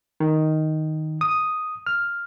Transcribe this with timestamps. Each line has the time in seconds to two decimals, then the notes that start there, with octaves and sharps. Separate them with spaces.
0.20 D#3
1.21 D#6
1.86 F6